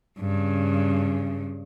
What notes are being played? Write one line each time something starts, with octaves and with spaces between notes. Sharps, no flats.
G2 C#3